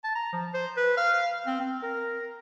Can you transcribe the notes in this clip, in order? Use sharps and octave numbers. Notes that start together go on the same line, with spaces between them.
A5
A#5
F3
C5
B4
F5
C4
C4
A#4